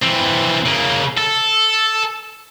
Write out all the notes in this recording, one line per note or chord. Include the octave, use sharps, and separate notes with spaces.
E3 C4
C#3 A#3
A4